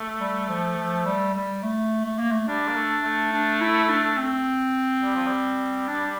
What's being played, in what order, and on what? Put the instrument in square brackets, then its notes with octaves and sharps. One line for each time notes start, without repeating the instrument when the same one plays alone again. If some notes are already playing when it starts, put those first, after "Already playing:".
Already playing: [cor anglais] A3
[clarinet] G3
F3
F3
G3
G3
A3
A3
A#3
A3
[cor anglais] G3 [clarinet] D4
[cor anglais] A#3
A3
A3
[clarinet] D4
E4
D4
C4
[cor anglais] G3
F3
G3
[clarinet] D4